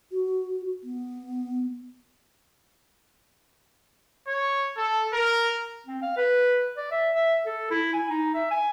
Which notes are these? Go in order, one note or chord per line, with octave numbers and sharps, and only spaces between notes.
F#4
B3
C#5
A4
A#4
C4
F5
B4
D5
E5
E5
A4
E4
G#5
D#4
E5
G#5